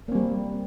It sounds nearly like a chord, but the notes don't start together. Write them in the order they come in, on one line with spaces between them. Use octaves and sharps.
A#3 C4 G3